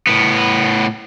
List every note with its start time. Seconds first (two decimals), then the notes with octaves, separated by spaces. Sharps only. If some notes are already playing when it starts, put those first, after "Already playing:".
0.07 A2 B3